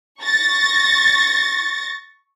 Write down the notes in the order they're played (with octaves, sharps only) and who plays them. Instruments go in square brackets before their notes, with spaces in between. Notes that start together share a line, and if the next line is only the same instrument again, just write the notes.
[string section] C#6 A6 A#6